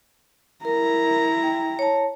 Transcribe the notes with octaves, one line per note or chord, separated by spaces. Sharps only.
E4 A#4 A#5
G5
C#5 A5